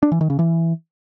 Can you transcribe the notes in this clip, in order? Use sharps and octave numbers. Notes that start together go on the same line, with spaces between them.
D4
E3
D#3
C#3
E3